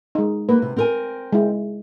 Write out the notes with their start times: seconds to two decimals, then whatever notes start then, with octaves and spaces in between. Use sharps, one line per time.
0.15 G#3 D#4
0.49 A#3 B4
0.62 C3
0.77 C4 A#4 G#5
1.33 G#3 E4